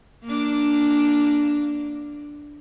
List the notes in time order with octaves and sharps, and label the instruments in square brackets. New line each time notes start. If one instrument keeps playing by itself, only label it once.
[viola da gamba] A#3 D4